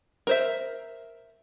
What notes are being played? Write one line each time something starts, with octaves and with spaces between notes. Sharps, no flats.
A#4 C5 E5